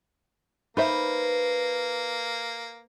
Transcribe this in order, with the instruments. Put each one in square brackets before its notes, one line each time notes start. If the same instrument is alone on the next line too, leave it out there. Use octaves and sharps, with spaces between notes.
[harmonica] A#3 [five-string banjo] D#4 C5 E5 [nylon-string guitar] B4